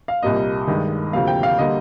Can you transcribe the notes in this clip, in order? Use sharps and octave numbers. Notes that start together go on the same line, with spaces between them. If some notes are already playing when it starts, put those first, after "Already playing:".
F5
C2 A#2 G3 A#3 D#5
G2 D#3 G#3
D2 C3 F3 A#3 F5
G5
F5
D3 G3 A#3 D#5